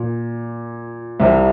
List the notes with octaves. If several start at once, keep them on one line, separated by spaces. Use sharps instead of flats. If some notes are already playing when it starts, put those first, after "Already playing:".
Already playing: A#2
C2 C3 G3